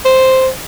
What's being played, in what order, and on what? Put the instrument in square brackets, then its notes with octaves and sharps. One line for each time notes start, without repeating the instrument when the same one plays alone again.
[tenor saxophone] C5